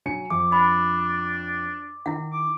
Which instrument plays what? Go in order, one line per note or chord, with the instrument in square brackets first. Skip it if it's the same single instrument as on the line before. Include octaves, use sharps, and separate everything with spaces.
[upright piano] F#3 G#5 C#7
[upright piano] F2 [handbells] D6
[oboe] D4 [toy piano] B5
[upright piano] D#3 [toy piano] E4 F#5
[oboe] D6